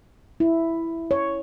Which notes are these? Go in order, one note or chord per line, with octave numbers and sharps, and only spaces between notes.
E4
C#5